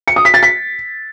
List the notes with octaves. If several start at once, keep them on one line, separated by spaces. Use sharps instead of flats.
C#7
D#6
B6
A6
B6